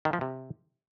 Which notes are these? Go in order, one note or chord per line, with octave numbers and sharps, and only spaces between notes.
D#3
F3
C3